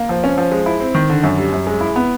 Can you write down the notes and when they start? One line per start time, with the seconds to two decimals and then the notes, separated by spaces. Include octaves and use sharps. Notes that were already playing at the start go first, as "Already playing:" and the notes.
Already playing: A#3
0.09 F3
0.24 C#4
0.38 F3
0.52 G#3
0.66 E4
0.80 C4
0.95 D#3
1.10 D3
1.23 F#2
1.38 G3
1.52 F#2
1.67 G#3
1.81 E4
1.96 B3